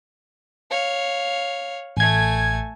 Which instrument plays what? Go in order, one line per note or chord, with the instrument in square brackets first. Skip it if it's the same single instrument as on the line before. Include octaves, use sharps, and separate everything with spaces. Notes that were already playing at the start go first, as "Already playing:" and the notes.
[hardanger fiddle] C#5 F5
[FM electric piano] A1 G#6 [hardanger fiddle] A3 G#5